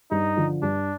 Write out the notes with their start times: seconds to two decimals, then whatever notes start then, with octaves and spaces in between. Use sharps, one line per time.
0.11 G2 D#4
0.37 D3 F3
0.62 G2 D4